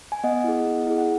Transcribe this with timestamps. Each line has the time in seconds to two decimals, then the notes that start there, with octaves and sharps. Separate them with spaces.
0.12 G#5
0.24 B3 D#5 F#5
0.44 E4 G#4
0.66 B3
0.87 E4 G#4
0.98 F#5